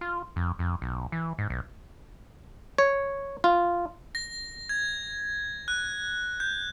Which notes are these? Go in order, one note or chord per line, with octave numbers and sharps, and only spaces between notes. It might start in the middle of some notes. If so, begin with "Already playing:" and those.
F4
F2
F2
B1
E3
G#2
B1
C#5
F4
A#6
G#6
F#6
G6